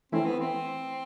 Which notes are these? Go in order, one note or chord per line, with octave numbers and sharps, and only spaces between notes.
E3 A3 C4 C#4 E4
B3
C4